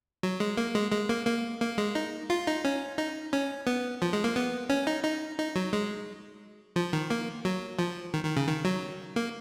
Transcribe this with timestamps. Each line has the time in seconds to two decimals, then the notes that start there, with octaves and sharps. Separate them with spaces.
0.23 F#3
0.40 G#3
0.58 A#3
0.75 G#3
0.92 G#3
1.09 A#3
1.27 A#3
1.61 A#3
1.78 G#3
1.95 D#4
2.30 F4
2.47 D#4
2.64 C#4
2.98 D#4
3.33 C#4
3.67 B3
4.02 F3
4.13 G#3
4.24 A#3
4.36 B3
4.69 C#4
4.87 D#4
5.04 D#4
5.39 D#4
5.56 F#3
5.73 G#3
6.76 F3
6.93 D#3
7.10 A#3
7.45 F#3
7.79 F3
8.14 D#3
8.25 D#3
8.37 C#3
8.48 D#3
8.65 F#3
9.16 A#3